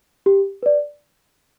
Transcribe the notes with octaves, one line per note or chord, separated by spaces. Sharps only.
G4
B4 D5